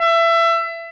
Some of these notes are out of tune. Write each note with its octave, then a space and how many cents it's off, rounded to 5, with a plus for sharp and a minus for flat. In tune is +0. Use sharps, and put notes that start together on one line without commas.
E5 +25